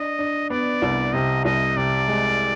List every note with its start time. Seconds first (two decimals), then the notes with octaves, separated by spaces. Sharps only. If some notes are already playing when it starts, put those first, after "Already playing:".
Already playing: D4 D#5
0.19 D4
0.50 B3 D5
0.82 C2
1.13 C3 D#5
1.45 C2 D#5
1.77 C3 D5
2.08 G#3